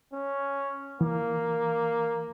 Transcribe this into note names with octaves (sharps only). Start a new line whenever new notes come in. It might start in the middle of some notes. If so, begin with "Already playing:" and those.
C#4
E3 A#3